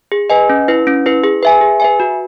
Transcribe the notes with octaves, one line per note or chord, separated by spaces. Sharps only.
G#4
B4 D#5 G#5
C#4
E4 B4
C#4
E4 B4
G#4
B4 E5 G#5
G#4
B4 E5 G#5
F#4